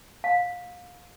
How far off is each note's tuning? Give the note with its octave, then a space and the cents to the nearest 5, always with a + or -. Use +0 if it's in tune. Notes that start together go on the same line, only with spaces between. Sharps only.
F5 +30